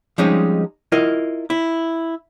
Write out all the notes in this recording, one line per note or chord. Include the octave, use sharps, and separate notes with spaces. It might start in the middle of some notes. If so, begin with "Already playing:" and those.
F3 G3 G#3 C4 C#4 D#4
E4 F4 A#4 D#5
E4